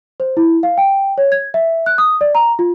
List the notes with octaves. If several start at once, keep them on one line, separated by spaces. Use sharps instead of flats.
C5
E4
F5
G5
C#5
G#6
E5
F#6
D#6
D5
A#5
F4